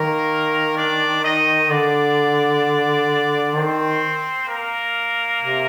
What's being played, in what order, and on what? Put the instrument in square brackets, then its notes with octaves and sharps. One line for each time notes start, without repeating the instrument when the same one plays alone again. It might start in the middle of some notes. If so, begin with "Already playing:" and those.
Already playing: [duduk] D#3 [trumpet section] A#3 A#4
[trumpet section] D4 D5
D#4 D#5
[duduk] D3 [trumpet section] D4 D5
[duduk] D#3 [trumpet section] C4 C5
[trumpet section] A#3 A#4
[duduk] C3